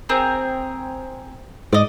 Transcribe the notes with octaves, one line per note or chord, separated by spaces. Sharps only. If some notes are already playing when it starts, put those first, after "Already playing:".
C4 G#4 A#4
G#2 D5 D#5